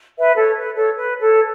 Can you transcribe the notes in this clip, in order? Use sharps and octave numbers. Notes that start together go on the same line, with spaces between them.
B4 E5
A4 C#5
B4
A4 C#5
B4
A4 C#5